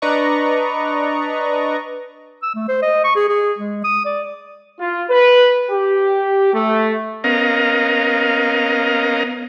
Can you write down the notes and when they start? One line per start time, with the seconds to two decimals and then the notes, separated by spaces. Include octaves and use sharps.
0.02 D4 B4 D5 D#5 A#5 C#6
2.43 E6
2.55 A3
2.68 C5
2.82 D#5
3.04 C#6
3.16 G#4
3.29 G#4
3.58 G#3
3.84 D#6
4.05 D5
4.79 F4
5.10 B4
5.71 G4
6.53 A3
7.24 B3 C#4 A#4 D#5 F5 A#5